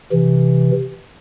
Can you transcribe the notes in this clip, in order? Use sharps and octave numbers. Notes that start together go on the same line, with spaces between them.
C3 E3